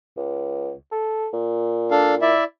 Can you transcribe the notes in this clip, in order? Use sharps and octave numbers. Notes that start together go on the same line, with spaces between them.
C#2
A4
A#2
D4 A4 F5
E4 D5 E5